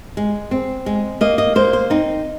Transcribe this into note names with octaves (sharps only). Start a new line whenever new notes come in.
G#3
C4
G#3
A#3 D#5
D#5
A#3 C5
C5
C4 D#4